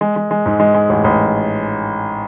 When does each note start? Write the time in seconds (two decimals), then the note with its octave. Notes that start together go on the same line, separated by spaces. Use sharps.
0.01 G#3
0.16 G#3
0.31 G#3
0.46 G#2
0.60 G#3
0.75 G#3
0.89 A1
1.04 A1